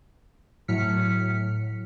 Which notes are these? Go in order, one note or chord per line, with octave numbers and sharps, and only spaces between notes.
A2 F#3 F6 B6 C#7